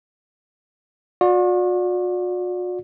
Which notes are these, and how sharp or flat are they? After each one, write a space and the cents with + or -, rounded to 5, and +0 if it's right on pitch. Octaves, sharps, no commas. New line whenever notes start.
F#4 -45 D5 +0